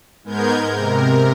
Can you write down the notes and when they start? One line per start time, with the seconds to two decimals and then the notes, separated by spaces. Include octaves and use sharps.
0.24 G#2 G#3 B3 A#4 G6 G#6
0.70 C3 A#4